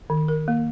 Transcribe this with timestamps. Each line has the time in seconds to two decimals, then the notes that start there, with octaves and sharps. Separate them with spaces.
0.10 D#3
0.28 A#4
0.48 A#3